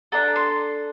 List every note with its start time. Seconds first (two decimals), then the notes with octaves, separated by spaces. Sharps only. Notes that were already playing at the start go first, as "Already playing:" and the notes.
0.12 D4 A4 A#5
0.36 C6